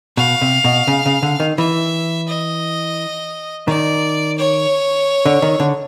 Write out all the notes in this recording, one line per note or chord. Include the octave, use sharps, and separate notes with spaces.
B2 F5
C3
B2
C#3
C#3
D3
D#3
E3 E5
D#5
D#3 D5
C#5
D3
D#3
D3